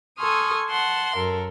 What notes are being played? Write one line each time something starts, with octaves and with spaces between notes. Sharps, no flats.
A4 G#5 C6 C#6 D#6 F6
F#5 A5 C6
F#2 A4 A#4